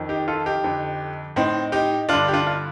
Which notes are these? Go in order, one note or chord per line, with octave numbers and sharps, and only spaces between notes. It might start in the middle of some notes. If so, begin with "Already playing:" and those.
Already playing: F2 D#3
D#4 G4
F4 A4
D#4 G4
F2 D3
A2 C4 D#4
D#4 G4
G2 D3 D4 F4
G4
D4 F4
F4